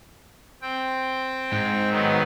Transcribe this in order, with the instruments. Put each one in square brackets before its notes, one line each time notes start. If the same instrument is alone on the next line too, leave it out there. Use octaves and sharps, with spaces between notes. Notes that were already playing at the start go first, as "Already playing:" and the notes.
[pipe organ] C4 G5
[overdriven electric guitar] G#2
[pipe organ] D#3 F#3 B3